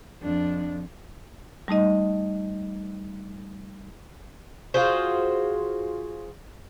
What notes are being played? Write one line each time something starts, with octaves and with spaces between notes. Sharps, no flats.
F2 D4
G3 A3 D#4 D#5
F4 F#4 G#4 C5